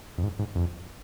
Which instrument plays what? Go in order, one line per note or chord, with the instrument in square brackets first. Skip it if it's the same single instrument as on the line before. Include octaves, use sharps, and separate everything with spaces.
[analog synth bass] F2
G#2
G#2
F2